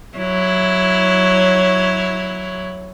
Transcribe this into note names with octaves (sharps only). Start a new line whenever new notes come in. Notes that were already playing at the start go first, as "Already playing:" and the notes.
F#3 E4 C#5